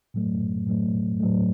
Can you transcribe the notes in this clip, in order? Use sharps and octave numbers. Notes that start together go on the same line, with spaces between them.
A2 F#3 A3
A2 F#3 A3
A2 F#3 A3